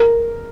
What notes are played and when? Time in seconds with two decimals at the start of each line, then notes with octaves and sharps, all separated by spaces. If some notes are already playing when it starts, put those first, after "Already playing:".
Already playing: A#4